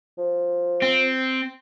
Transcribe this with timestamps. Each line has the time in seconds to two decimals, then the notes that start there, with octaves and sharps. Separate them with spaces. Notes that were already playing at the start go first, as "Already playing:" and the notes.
0.18 F3
0.82 C4